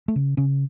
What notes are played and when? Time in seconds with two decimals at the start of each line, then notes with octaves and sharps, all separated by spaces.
0.08 A3
0.16 C#3
0.37 C#3 C#4